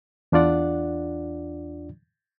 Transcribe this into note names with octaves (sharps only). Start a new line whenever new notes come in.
E2 D4 F4 D5 F#5